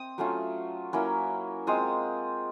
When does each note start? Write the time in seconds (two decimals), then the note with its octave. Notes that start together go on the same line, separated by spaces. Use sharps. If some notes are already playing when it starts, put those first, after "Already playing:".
Already playing: C4 D#6
0.18 F#3 A3 C#4 F4
0.93 F#3 A#3 C#4 E4
1.67 G#3 C4 F4 D#6